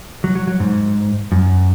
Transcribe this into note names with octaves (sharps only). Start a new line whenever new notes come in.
F#3
F#3
F#3
G#2
F#2